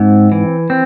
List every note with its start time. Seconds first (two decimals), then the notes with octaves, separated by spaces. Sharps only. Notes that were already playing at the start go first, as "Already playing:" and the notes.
Already playing: G#2 C4
0.32 E3
0.70 C4